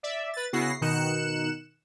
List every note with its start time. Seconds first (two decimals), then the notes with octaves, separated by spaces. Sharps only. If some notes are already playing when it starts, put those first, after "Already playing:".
0.03 D5 E5
0.33 B4 A6
0.53 C#3 B3 E4 F#4 A#6 C7
0.81 B2 D#3 D#4 F#6 C#7 E7